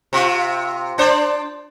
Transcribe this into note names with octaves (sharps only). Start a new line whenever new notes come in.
C3 F4
D4 C5 D5